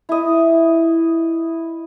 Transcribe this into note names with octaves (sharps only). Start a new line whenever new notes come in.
E4 D#5